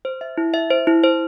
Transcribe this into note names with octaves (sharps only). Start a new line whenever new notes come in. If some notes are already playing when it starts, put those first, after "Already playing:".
C5
E5
E4
E5
C5
E4
C5